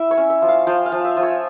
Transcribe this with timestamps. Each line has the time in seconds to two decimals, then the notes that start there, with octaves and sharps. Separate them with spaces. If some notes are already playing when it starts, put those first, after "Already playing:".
Already playing: E4 E5
0.11 C#5
0.17 C#4
0.30 E5
0.42 F3
0.48 F5
0.67 F3 G5
0.86 F5
0.92 F3
1.05 E5
1.17 F3
1.23 C#5